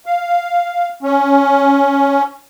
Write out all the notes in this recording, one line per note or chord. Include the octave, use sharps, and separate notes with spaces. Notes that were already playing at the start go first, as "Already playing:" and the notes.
F5
C#4